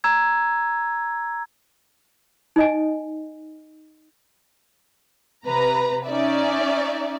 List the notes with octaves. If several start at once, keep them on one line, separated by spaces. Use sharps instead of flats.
A#5 E6 G#6
D#4 D#5 G#5
C3 B4 A#5
C#4 D#4 D5 E5